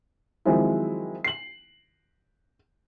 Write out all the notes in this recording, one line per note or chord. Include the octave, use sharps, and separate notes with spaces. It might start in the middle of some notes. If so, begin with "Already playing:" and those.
D#3 F3 F#3 G#3 C4 E4
C7 F#7